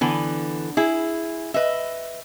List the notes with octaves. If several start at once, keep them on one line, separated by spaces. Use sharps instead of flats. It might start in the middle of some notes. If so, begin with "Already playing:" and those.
D3 E3 B3
E4 G#4
B4 D#5 E5